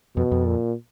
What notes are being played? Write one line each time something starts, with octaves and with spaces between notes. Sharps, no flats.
F2 B2
F2
A#2